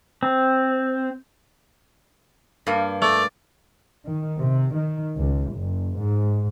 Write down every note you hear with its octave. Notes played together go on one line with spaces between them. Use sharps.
C4
G2 A#3
A3 D5
D#3
C3
D#3
C#2
F#1
G#2